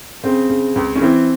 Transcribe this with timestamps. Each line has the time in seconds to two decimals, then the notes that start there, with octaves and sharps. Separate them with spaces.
0.24 C#3 C4
0.50 C#3
0.76 C#2
0.96 C#4
1.01 E3 C4